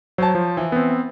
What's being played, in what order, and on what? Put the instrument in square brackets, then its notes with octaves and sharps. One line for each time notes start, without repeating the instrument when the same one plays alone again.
[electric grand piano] F#3 [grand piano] C5 C#5 A5
[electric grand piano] F3
[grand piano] E3
[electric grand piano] B3 C4